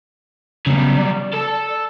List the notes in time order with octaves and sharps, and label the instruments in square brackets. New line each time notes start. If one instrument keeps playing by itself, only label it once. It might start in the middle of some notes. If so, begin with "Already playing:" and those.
[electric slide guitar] C#3 B3 [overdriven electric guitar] F#3 G3
[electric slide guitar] D5
[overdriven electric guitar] A4 A5